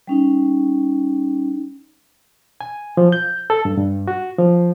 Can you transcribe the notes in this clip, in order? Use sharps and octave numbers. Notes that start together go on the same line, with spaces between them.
G3 C#4 D#4
G#5
F3
G6
A4
G2
G2
F#4
F3